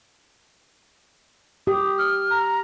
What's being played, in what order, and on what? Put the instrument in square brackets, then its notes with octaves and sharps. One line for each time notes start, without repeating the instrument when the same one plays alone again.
[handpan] G4 [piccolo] D#6
[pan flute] F6
[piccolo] A#5